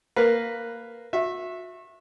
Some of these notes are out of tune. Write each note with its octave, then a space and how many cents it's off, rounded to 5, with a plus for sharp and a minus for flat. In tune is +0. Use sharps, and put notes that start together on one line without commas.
A#3 -5 B4 +0
F#4 -35 E5 +0